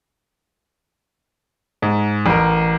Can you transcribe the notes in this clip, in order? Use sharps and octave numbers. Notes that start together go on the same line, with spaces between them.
G#2
A1 A#4